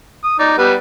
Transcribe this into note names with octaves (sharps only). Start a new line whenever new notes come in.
D#6
D#4 D5
G3 B3 B4